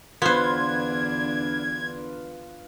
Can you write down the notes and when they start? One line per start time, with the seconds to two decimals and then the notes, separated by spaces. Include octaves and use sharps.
0.22 E2 D3 B3 D4 F4 B4 C5 G#6